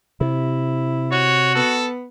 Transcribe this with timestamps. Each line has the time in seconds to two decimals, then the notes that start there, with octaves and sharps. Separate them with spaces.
0.21 C3 E4
1.12 F#4 C#5
1.55 B3 A4